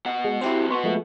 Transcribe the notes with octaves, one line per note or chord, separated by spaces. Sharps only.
B2 F#5
G#3
F#3 C4 E4 G4 C5
B3 F#4 C6 C#6
F3 G#3 A3